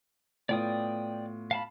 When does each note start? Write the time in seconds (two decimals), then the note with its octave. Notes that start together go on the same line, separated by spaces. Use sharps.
0.49 A2 B3 F4 D5 G5 D#6
1.51 F5 A5 B5